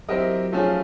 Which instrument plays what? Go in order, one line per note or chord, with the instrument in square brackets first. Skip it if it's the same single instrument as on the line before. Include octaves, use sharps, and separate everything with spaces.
[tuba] F#3 [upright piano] C4 E4 G4 A#4 D#5
[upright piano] F3 A3 C#4 F4 G#4